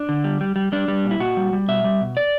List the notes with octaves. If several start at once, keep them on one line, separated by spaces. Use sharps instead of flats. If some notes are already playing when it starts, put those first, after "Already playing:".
Already playing: D4
D3
G3
G3
G3
G3 D4
G3
A#2
E4
A#2 F#4
G3
G3
B2 E5
G3
B2
D5